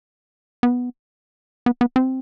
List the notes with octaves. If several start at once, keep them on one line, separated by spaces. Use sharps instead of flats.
B3
B3
B3
C4